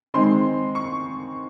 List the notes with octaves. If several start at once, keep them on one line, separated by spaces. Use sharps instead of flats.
D#3 G#3 C4 C6
C#6